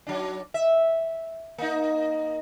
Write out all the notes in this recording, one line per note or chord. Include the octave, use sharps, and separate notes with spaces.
F#3 D4
E5
A#3 D#4